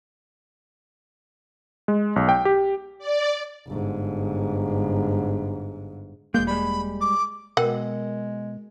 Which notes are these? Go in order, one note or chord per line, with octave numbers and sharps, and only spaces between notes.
G#3
B1
G5
G4
D5
G1 G#2
E1 G#3 A#3 G6
G3 G#3 B5
D6
B2 G#3 A#4 F#5 G5 E6